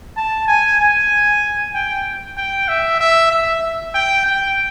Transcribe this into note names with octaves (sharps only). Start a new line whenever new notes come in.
A5
G#5
G#5
G5
G5
E5
E5
E5
G5
G5